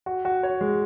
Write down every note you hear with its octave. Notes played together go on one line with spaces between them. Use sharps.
F#4
F#4
C#5
G#3